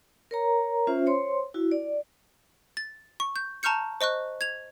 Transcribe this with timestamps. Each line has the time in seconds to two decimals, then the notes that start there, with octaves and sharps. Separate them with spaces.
0.31 A#4 C#5 A#5
0.87 C#4 F4 C5 E5
1.06 C5 C#5 C6
1.54 E4 F#4
1.72 D5
2.77 A6
3.20 C#6
3.36 G6
3.63 A5 A#5 C#6 F6 G6 C#7
4.01 C5 D#5 C#6 F#6
4.41 G#6 F7